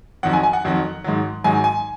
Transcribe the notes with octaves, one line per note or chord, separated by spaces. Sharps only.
F2 D#3 F#3 F#5
G#5
G#5
F#5
F2 D#3 F#3
G#2 D#3 F#3
G#2 D#3 F#3 G#5
G#5